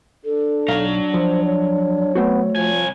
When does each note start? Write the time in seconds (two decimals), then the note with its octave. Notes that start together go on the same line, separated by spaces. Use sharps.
0.25 D4 A4
0.68 B1 F#3 F5 A#5
1.14 F3 C5
1.46 C#5
2.15 A3 B3 C4 F#4
2.56 C2 F3 G#5